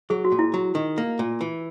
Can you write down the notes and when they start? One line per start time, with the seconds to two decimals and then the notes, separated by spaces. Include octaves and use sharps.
0.10 F#3 G#4
0.25 F#4
0.32 A#2
0.39 E4
0.54 F#3
0.75 D#3
0.98 A#3
1.19 A#2
1.41 E3